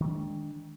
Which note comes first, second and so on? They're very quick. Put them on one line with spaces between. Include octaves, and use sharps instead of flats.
D#3 A3 D4 G#3